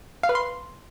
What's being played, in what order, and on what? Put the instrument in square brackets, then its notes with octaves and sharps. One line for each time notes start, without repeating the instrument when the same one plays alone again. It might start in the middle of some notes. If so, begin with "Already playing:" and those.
[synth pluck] F5
B4
C6